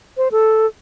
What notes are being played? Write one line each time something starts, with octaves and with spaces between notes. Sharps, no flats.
C5
A4